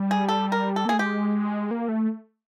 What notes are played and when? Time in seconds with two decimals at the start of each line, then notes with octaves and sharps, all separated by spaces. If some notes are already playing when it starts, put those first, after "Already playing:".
Already playing: G3
0.11 G#4
0.29 A4
0.52 A#4
0.76 A4
0.85 A#3
0.89 A3 G#4
0.99 G#3 G4
1.71 A#3
1.89 A3